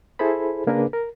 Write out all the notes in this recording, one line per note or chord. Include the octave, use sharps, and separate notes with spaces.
E4 G#4 A4 C5 B5
C#3 A#3 D4 G#4 A#4 B4
A#4